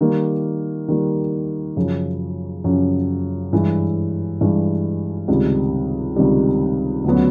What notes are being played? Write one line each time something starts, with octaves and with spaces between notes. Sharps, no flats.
D#3 G3 A#3
D#3 G3 A#3
F#2 C#3 F3
F#2 C#3 F3
G2 E3 G#3
G2 E3 G#3
C#2 C3 D#3 G3
C#2 C3 D#3 G3
D2 C#3 F#3 B3